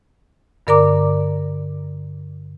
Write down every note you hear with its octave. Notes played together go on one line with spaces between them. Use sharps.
G2 D3 A#4 D5 A#5 D6